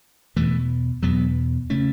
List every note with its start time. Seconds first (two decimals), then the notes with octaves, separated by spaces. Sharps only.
0.36 E2 B2 E3 A3
1.03 E2 B2 F#3 B3
1.70 C#3 A3 C#4